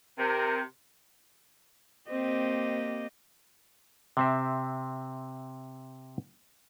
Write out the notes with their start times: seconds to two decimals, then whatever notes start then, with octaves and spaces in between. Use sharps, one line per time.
0.19 C3 A#4
2.10 A#3 C4 G4 D#5
4.17 C3 C4 E5